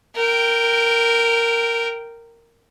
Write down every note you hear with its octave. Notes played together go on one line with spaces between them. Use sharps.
A#4 G5